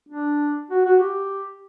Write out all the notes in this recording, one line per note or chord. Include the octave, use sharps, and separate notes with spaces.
D4
F#4
F#4
G4